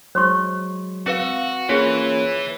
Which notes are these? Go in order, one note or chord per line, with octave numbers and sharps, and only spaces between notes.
F#3 G#3 C5 C6 C#6
C4 F#4 B4 F5
A#3 C#4 E4 F4 G#4 B4 C#5